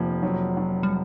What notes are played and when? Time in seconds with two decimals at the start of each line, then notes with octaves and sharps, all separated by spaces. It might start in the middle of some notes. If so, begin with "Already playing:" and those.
Already playing: F1 F3 A#3
0.23 F#3
0.57 F#3
0.83 G3